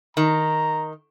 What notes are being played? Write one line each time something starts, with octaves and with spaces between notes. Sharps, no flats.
D#3 A#5